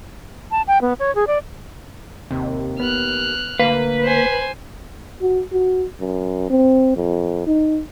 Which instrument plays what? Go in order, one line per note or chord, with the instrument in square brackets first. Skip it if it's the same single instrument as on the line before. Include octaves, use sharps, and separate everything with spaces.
[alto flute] A5
G5
B3
C#5
G#4
D5
[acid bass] D#2 [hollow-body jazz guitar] C3
[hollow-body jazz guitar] B3 [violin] F6 F#6
[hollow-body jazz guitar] D2 F5 [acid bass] A#3 [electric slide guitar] B4
[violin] C5 G#5
[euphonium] F#4
F#4
F#2
C4
F2
D#4